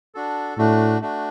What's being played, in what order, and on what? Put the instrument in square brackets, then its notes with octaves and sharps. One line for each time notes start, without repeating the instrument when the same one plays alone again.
[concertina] D4 F#4 A4
[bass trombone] A2 [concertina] A3 D4 F#4
[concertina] A3 D4 F#4